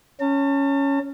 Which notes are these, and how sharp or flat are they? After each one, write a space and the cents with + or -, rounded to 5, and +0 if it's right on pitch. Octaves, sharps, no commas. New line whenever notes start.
C#4 +0 A5 +40